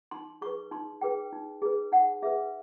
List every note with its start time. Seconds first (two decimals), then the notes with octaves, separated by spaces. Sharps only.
0.11 D#4 C6
0.41 G#4 B4 C#6
0.71 D#4 C6
1.01 G#4 B4 G5
1.32 D#4
1.62 G#4 B4
1.92 D#4 F#5
2.22 G#4 B4 E5